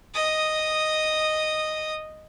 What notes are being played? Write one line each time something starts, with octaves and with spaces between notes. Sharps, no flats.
D#5 D#6